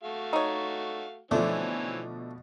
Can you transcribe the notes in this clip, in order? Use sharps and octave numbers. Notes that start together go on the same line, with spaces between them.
A3 F#4 F5
D#4 C#5
B2 D3 E3 F3 A3 C4 C#4 D5